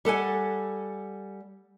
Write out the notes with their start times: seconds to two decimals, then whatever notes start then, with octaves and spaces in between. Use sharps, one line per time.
0.05 G3 A4 F#5 G#5